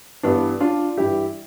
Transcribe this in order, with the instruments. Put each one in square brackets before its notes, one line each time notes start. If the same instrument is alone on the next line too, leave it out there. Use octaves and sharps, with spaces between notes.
[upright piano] G2 E3 G3 B3 D4
D4 F4
G2 E3 G3 E4 G4